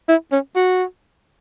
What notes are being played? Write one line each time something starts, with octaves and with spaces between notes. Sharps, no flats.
E4
C#4
F#4